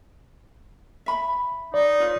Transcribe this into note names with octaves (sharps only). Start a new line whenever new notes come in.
E5 B5
D#4 D5
F4 B4 C#5